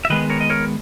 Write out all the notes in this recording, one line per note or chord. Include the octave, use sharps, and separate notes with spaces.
E5
D#3 G#3 B3 B4 D#5
A#4 C#5
D#5
A#4 C#5